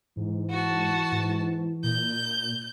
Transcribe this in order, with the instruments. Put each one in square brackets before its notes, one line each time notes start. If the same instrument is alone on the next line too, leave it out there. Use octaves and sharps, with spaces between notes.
[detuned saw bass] G#2 [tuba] E3
[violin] F#4 A5
[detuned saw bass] G#2
[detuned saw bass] A#2 [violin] G6